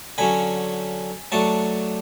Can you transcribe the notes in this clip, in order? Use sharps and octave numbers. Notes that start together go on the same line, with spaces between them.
D3 F#3 C#4 G#5 B5
F#3 A3 D4 A5 C#6